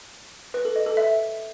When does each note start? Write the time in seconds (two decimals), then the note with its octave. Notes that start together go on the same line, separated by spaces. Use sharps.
0.54 B4
0.65 A4
0.76 D#5
0.86 A4
0.97 E5